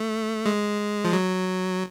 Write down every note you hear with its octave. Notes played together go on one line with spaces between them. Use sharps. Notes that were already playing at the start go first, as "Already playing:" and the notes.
Already playing: A3
G#3
F3
F#3